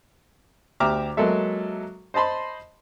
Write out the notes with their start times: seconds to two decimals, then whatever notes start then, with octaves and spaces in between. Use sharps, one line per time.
0.80 D2 G4 E5 A#5 D6 F6
1.17 F#3 G#3 A#3 A4 E5
2.14 C5 D#5 A5 B5 C6